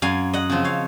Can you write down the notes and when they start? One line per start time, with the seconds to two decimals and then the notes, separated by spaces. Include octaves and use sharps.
0.02 F#2 F5 G#5
0.33 D#5 F#5
0.50 C#3 F3 C4
0.64 C#5 F5